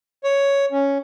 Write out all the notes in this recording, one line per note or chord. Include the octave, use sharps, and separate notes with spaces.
C#5
C#4